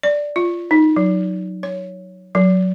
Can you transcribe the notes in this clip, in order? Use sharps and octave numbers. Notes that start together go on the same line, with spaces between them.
D5
F4
D#4
F#3
C#5
F#3